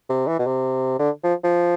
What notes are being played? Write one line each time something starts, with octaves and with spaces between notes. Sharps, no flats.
C3
E3
B2
C3
D3
F3
F3